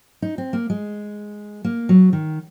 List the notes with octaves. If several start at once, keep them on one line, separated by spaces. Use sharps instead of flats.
D#4
C4
A#3
G#3
A#3
F#3
D#3